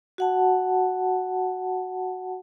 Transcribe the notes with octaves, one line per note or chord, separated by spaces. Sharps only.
F#4 F#5 A5